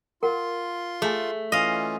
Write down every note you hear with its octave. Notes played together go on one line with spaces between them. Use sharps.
F4 A#4 F#5 C6
A3 G#4 G#5
E3 C#4 F4 D#5 F5